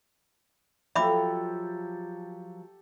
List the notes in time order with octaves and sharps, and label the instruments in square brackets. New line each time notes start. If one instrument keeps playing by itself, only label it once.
[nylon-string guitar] F3 F#3 F4 [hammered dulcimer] G4 A4 [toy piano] E5 B5 D6